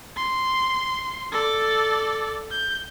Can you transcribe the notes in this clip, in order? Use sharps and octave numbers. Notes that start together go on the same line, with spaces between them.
C6
A4 D5
G6